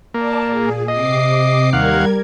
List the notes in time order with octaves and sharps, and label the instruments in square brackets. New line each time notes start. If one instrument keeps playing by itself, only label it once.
[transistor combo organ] A#3 [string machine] D5 A5
[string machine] A#2 G#4
[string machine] C3 D6 C7 [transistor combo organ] D#5
[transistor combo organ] D#2 F5 F#5 [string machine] G3 A#4 G#6